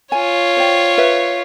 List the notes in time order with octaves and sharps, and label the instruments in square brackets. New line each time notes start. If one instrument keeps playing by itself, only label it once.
[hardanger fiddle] F4 C#5 [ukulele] G#5
[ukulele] C5 D5 G5
B4 E5